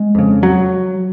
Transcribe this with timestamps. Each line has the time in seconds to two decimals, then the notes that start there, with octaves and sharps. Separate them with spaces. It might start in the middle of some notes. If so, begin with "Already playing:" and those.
Already playing: G#3
0.15 F2 C#3
0.43 F#3